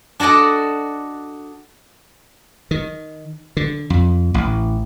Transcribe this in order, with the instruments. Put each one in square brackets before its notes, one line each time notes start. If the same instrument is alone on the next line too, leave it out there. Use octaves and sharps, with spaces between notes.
[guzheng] D4 F#4 A4 D5 D#5
[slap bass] D#3
D3
F2
A1